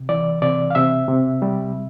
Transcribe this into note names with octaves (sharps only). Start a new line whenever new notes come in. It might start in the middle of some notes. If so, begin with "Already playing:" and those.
Already playing: C3
E3 D5
C3 D5
F5
C3 E5
C3
G3